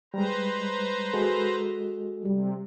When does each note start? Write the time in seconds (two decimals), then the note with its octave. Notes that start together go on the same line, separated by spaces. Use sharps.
0.14 G3 G#3 B4 C5 A#5
1.13 G#3 F#4 A4
2.24 C3 G3